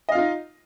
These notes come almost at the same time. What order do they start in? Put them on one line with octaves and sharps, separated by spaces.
D#5 F5 F4 D#4